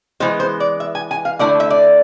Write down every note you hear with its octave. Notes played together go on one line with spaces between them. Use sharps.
E3 G#3 B3 C5
C5
D5
E5
G#5
G#5
F5
D3 A3 E4 D5
E5
D5